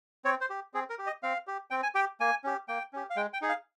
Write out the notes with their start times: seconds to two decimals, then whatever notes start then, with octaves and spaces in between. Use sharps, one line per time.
0.25 C4 C#5
0.41 C5
0.50 G4
0.74 C4 G#4
0.90 A#4
0.99 G4
1.07 D#5
1.23 C4 F5
1.47 G4
1.71 C4 G5
1.83 G#5
1.95 G4 G5
2.20 A#3 G#5
2.44 C#4 G4
2.68 A#3 G5
2.93 C#4 G4
3.10 F5
3.16 G#3 G5
3.33 G5
3.42 D#4 G#4
3.49 F5